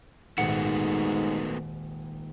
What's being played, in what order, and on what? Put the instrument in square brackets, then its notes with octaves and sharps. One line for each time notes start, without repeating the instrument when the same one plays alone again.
[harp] D#1 G#1 [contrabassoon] G#2 [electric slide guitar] A3 B3 F#4 [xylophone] F#5